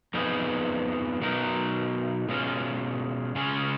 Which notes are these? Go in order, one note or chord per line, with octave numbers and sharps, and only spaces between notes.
F2 F3 B3 D#4 G#4
B2 F#3 B3 D#4 A#4
B2 G#3 C#4 F4
C#3 G#3 C#4 F4 G#4